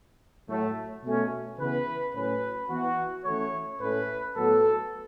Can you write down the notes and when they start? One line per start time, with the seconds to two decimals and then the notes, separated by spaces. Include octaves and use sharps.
0.49 A2 F#3 A3
1.04 B2 A3 C#4
1.59 C#3 E3 B3 B4
2.15 A2 F#3 C#4 B4
2.70 E3 B3 F#4
3.25 E3 A3 C#4 C#5
3.81 A2 A3 C#4 B4
4.36 A2 F#3 B3 A4